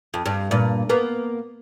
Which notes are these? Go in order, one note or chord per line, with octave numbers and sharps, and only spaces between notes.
F2
G2
G2 A#2
A#3 B3